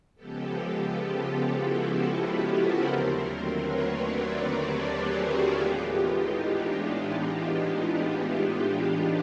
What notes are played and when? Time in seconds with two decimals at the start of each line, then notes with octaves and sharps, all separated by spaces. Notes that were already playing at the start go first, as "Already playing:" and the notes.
0.15 C#3 F3 G#3 B3 G4 A4
0.84 F4 G4
1.52 E4 F#4
2.20 A4 B4
2.54 A#4 C5
2.88 D#2 D3 F#3 A3 C4
3.56 B4 C#5
3.90 C5 D5
4.24 B4 C#5
4.58 G4 A4
4.92 F#4 G#4
5.26 F4 G4
5.60 A2 E3 G#3 B3 F4 G4
5.94 D#4
6.28 D4